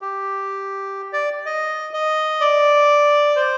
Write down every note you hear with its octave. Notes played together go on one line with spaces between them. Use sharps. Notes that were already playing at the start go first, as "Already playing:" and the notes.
G4
D5
D#5
D#5
D5
C5